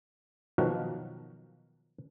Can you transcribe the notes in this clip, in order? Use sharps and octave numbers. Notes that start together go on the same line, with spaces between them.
B2 D#3 F3 F#3 F#4 A#4